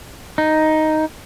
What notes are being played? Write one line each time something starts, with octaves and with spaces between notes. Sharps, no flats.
D#4